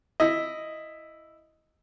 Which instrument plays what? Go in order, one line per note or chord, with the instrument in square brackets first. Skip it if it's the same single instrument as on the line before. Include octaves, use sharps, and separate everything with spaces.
[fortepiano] E4 D#5